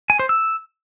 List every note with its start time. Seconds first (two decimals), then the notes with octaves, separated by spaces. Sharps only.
0.10 G#5
0.19 C5
0.29 E6